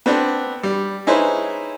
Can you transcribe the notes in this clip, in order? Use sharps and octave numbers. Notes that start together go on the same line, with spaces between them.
B3 C4 D4
G3
C#4 D#4 E4 G#4 B4 C5